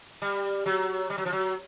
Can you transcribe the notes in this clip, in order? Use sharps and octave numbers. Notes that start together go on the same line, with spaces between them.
G3
F#3
G3
F#3
F3
F#3